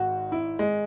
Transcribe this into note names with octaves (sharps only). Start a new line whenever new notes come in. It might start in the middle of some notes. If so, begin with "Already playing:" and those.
Already playing: G#1 G#2 D#3 F#4
E4
G#3